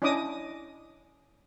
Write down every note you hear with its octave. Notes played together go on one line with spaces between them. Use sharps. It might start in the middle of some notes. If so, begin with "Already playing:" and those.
C#4 D4 E4 D#5 D6 D#6